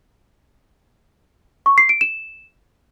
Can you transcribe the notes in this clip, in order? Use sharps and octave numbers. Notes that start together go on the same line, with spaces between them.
C#6
C7
D7
E7